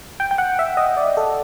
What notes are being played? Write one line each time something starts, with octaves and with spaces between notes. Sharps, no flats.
G5
G5
F#5
E5
D#5
D5
A4